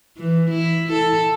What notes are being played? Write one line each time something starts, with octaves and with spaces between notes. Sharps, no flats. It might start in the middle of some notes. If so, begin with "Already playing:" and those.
E3
E4
A4